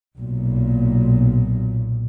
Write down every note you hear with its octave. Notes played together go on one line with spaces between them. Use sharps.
B1 A#2